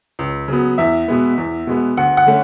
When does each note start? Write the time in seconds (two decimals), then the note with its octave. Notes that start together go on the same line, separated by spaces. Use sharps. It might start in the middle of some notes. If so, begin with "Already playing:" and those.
0.19 C#2
0.48 C#3 F#3 B3
0.78 E2 E5
1.08 B2 G#3 B3
1.38 E2
1.67 B2 G#3 B3
1.97 D2 F#5
2.17 F#5
2.26 D3 A3 C#4